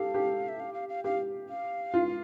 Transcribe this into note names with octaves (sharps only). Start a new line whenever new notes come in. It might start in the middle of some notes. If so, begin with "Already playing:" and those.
Already playing: G4 A4 F5
G4
E5
F5
F5
F5
G4 F5
F5
F4